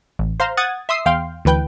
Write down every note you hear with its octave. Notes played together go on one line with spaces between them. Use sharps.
A1
C5 F5 A#5 C6
F#5 D#6 F#6 G#6 A6
E5 C6 D#6 E6 C7
E2 F5 G5 C6
D2 E3 B4 G5 G6